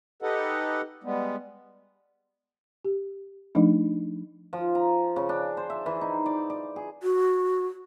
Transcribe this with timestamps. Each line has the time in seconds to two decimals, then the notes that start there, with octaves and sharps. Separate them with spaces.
0.22 D#4 G4 A4 B4 D#5 F#5
1.04 G3 G#3 B3
2.85 G4
3.55 F3 A3 D4 D#4
4.53 F3
4.75 A#5
5.16 C#3
5.29 D4
5.57 C5
5.70 E5
5.86 E3
6.01 D#4
6.26 D5
6.50 D5
6.76 G#4
7.02 F#4